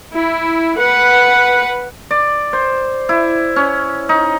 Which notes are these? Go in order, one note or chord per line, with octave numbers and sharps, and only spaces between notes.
E4
B4 F#5
D5
C5
E4
C#4
D#4